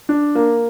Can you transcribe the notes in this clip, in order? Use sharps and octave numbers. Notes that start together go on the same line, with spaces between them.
D4
A#3